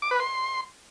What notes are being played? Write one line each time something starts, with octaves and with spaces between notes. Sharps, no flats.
D6
B4
C6